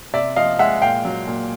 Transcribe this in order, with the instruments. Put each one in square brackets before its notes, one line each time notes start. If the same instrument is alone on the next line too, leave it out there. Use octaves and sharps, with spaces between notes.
[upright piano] C3 D5 E5
F3 D#5 F5
G#3 E5 F#5
A#2 F5 G5
F#3
A#2